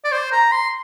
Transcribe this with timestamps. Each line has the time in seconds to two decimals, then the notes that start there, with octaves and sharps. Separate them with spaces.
0.04 D5
0.12 C5
0.32 A#5
0.52 C6